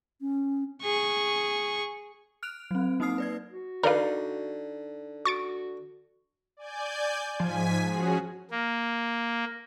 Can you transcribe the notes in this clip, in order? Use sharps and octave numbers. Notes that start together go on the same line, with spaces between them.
C#4
G#4 C#6
F6 F#6 D7 F7
F#3 C4
A#3 C4 D#4 D#6 F6 C7
B4 D5 G#6
F#4
D3 D#4 A#4 B4 D5 F5
F#4 C#6 A6 D7
D5 G#5 G6
G#2 F3 G#5 B6
C#4 F#4 G#4
A#3